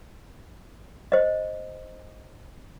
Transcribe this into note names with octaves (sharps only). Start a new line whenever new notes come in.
C5 D#5